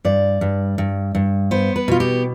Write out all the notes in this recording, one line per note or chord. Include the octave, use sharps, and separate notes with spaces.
G2 D5
G2
G2
G2
B3 C5
B4
B2 F4
G4